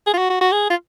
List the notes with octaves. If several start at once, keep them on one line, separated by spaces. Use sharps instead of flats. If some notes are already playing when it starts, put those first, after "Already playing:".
G#4
F4
F#4
F#4
F#4
G#4
F4